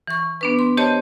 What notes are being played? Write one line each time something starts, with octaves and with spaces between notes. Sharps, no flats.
E3 C#6
B3 D4 B4
C6
G4 C5 C#5 D#5 A5 C6